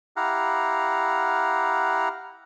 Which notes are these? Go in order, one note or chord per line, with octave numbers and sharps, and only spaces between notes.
E4 G4 F5 F#5 A#5